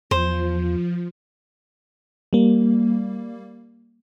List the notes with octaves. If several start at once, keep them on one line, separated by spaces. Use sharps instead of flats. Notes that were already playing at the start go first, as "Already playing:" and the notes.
E2 F3 C5
G3 A#3